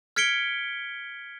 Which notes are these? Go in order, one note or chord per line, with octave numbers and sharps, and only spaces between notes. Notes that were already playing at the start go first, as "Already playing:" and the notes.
F6 G#6 B6 C#7 D7 G7